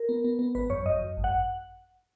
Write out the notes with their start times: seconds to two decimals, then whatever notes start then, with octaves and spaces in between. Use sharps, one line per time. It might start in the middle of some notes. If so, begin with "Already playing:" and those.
Already playing: A#4
0.09 B3
0.24 B3
0.39 B3
0.55 G#1 B4
0.70 F#2 C#5
0.86 F#2 D#5
1.02 F#2
1.17 G#1
1.24 F#5